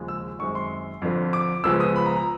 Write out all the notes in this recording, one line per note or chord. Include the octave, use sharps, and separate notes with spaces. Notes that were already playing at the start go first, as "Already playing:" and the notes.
Already playing: D#2 C#3 F3 G#3
E6
F#2 D#3 G#3 C4 C#6
C6
F2 D3 F3
D6
C#2 C#3 F3 G#3 B3 E6
D#6
B5
A#5
A#5